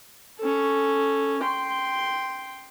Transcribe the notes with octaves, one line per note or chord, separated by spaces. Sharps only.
C#4 A4
G5 C6